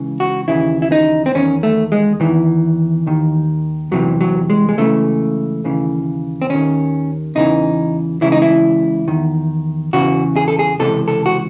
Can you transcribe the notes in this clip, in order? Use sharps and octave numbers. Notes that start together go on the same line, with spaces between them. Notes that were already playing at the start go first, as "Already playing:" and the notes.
Already playing: C#2 C#3 E3
F#4
D#2 C#3 E3 E4
E4
D#4
C4
E2 D#3 C#4
A3
G#3
E2 D#3 E3
D#2 D#3
E2 C3 E3 F#3
F#3
G#3
G#3
C#2 C#3 E3 A3
D#2 C#3 E3
C4
D#2 D#3 C#4
E2 C#3 E3 D#4
C#2 C#3 E3 E4
D#4
E4
E2 D#3
E2 C#3 E3 F#4
G#4
A4
G#4
C#2 C3 E3 A4
A4
F#4